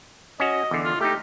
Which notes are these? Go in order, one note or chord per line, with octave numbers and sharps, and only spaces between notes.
C#4 F#4 D#5
E2 D3
F4
A3 D#4 G4